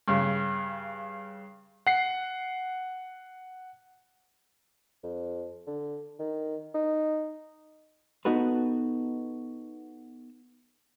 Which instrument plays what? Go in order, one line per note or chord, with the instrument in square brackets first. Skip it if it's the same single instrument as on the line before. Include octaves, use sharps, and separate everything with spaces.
[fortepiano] G2 C#3
[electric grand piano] F#5 C7
[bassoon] F2
D3
D#3
D#4
[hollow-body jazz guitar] B3 D#4 F#4 A4 B4